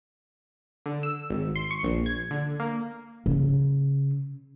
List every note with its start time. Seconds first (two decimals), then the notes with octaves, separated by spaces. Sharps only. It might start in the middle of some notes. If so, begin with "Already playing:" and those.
0.86 D3
1.03 E6
1.30 G#1
1.56 C6
1.71 C#6
1.83 A#1
2.06 G#6
2.31 D3
2.60 A#3
3.26 C#3